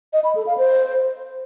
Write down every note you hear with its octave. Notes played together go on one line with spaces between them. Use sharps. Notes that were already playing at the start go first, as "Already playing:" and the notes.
D#5
B5
A4
F5
C5